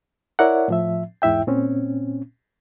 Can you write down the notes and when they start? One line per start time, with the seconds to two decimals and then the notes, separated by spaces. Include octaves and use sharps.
0.39 E4 A#4 C#5 D5 E5 F#5
0.68 A2 F3 E5
1.22 E2 G#2 E4 E5 G5
1.47 A#2 C4 C#4